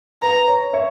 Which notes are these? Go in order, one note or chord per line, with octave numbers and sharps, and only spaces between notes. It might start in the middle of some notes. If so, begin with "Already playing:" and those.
B4 A#5
C#5
C#5 E5